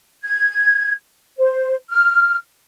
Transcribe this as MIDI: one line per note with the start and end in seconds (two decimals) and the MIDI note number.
0.24 0.92 92
1.38 1.75 72
1.90 2.36 89